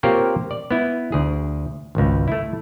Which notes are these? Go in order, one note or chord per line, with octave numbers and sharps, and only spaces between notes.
A#3 C4 F4 G4 A#4 C#5
D5
B3 E4
D2 G#4
G#1 C#2
A3 E4